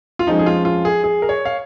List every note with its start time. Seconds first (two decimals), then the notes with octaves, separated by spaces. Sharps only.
0.19 F4
0.27 F2 F3 G#3 C#4 D#4
0.39 G#4
0.46 F4
0.65 F4
0.85 G#4
1.04 G#4
1.22 A#4
1.29 C#5
1.45 F5